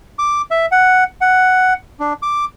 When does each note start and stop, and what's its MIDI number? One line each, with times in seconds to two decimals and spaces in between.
0.19 0.42 86
0.51 0.66 76
0.72 1.04 78
1.21 1.74 78
2.00 2.13 62
2.22 2.45 86